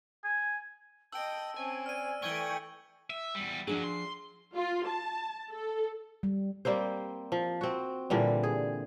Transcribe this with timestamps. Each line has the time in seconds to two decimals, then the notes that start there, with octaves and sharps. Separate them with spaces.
0.24 G#5
1.12 D#5 G5 A5 E6 D7
1.56 C4 C#4 G#5
1.86 D5 F6 D#7
2.22 E3 A3 G5 G#5 C#6 E6 G#6 G7
3.10 E5
3.35 E2 G3
3.67 F#2 F3 F#3 D4 G#4
3.84 C6
4.54 F4
4.86 A5
5.50 A4
6.23 G3
6.65 G3 A#3 C4 C5
7.32 F3
7.61 C4 F#4
8.10 A#2 D3 E3 G3
8.43 G#4